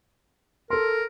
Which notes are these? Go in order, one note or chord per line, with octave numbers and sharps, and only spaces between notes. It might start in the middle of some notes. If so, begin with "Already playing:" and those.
A4 A#4 C6